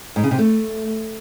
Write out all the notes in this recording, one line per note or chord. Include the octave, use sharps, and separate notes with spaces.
G#2
C#3
C3
A3